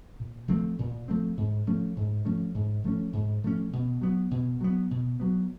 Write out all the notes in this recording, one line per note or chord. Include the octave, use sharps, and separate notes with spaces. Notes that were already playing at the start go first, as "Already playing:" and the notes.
A#2
F3 A3 C4
A#2
F3 A3 C4
G#2
F3 A3 C#4
G#2
F3 A3 C#4
G#2
F3 A3 C#4
G#2
F3 A3 C#4
B2
F#3 B3
B2
F#3 B3
B2
F#3 B3